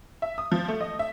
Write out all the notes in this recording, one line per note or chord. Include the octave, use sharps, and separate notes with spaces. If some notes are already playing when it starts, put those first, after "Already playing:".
E5
D#6
F3
A3
D#5
E5